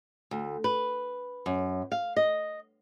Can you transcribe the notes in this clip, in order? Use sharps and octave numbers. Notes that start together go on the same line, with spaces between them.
D2
B4
F#2
F5
D#5